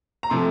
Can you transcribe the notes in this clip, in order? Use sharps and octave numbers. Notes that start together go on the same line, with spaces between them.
A#5
C3 F3 A3 C6